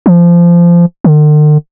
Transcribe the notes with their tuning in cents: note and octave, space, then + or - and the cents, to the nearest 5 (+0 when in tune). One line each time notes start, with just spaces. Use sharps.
F3 -20
D3 +45